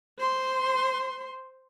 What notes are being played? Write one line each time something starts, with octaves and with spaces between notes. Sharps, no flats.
C5 C6